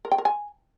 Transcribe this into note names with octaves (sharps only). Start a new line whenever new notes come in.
A#4
G5
A#4
G#5